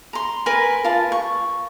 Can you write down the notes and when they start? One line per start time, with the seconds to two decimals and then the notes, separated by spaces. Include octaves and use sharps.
0.13 A#5 C6
0.46 A#4 B4 G#5 B5
0.84 F4 A5
1.12 C#6